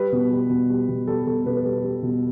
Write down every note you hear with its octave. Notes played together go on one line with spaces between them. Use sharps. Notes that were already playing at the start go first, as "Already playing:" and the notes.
Already playing: G3 B4
B2
G3
B2
G3
B2
G3 A4
B2 A4
B2 B4
B4
G3 A4
G3
B2